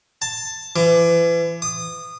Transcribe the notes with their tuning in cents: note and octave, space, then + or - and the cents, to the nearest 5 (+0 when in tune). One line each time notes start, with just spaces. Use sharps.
A5 +10
E3 +35
D#6 -20